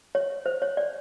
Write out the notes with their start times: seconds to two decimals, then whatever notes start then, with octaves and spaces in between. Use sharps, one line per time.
0.15 C#5
0.46 C5
0.62 C#5
0.77 D5